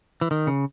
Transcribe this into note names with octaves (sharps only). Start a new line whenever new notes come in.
E3
D#3
C#3